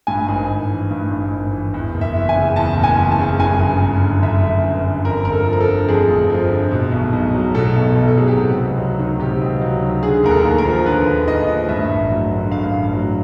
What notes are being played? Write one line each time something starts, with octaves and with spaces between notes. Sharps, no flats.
G2 G#5
G#1
G#1
E3
G2
G#1
G#1
E3
E2
F#1
E5
E3
G#5
C#3
E2 A5
F#1
G#5
E3
A5
C#3
F#2 G#5
G1
G1
D3
F#2 E5
G1
G1
D3
F2 A#4
G1 A#4
A4
F3
A#4
A4
D3
F2 G#4
G1
F3
D3
B2
B1
B1
F#3
B2 A4
B1
B1
A4
F#3 G#4
G4
C3 F#4
C#2
F#3
D#3
C3 G4
C#2
F#3
D#3
D3 G#4
D#2 A#4
A4
D#2
A#4
F3
D3 B4
D#2
D#2 D#5
F3
G2 E5
A1
F#3
D3
G2 F5
A1
F#3